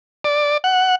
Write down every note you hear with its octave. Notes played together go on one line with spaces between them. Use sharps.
D5
F#5